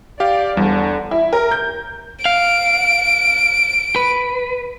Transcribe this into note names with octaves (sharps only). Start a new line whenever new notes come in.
G4 D5 F5
E2 D3 G3
E4
A#4
G6
F5 D7
B4